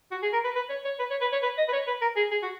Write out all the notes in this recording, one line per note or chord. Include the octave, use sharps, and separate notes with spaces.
F#4
G#4
A#4
B4
B4
C#5
C#5
B4
C#5
B4
C#5
B4
D#5
B4
C#5
B4
A#4
G#4
G#4
F#4